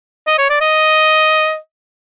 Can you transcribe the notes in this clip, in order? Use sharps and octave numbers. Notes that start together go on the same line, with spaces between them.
D#5
C#5
D5
D#5